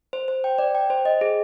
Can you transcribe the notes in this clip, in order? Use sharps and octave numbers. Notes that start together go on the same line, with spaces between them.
C5
C5
G5
D5
G5
C5
D#5
G#4